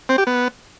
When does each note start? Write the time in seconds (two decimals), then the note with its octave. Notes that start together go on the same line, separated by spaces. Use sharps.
0.09 C4
0.18 G4
0.27 B3